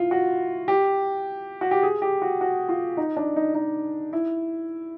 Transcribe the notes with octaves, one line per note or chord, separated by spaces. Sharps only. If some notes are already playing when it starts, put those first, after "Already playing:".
Already playing: E4 F4
F#4
G4
F#4
G4
G#4
G4
F#4
F#4
F4
D#4
D4
D#4
D#4
E4